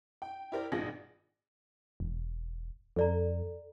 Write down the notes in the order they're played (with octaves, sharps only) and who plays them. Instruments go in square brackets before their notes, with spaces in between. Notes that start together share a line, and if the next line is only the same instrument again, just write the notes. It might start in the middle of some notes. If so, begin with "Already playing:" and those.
[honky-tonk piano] G5
E4 G4 A#4 C5 D5
G#1 G2 B2 F4 G#4 A#6
[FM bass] E1
[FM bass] F2 [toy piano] A4 D5 A#5